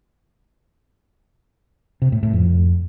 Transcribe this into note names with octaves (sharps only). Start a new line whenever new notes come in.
C3
A2
A2
F2